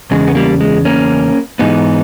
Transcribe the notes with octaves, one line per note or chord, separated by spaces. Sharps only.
E2 C#3 G#3
B3
G3 A#3
G#3
A#3 C#4
G#2 E3 B3 D#4